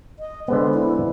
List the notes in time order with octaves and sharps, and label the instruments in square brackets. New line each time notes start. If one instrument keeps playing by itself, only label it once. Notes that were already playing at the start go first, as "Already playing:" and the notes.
[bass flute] D#5
[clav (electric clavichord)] D3 G#3 B3 [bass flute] C5
[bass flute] E4